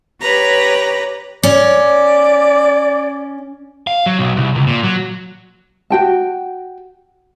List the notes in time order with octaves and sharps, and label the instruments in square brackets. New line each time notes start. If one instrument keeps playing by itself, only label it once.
[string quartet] G4 B4 C#5 A#5
[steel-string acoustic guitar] C#4 [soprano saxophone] D5
[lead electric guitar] F5
F#3
B1
C2
C#2
A#2
F#3
[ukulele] F#4 G5 A5